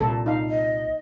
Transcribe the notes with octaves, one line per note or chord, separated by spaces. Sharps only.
C2 A#2 A4
D#4 F5
D#5